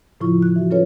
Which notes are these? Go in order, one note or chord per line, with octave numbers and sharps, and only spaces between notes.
A2 C#3 F3 E4 F4 C#6
F#6
E3 F#4
F#3 C#4 F4 A4 B4 C#5